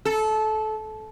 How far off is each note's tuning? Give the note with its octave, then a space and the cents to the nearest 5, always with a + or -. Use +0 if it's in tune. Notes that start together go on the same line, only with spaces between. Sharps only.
A4 -20